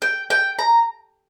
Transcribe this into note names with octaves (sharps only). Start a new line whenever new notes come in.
G5
G5
A#5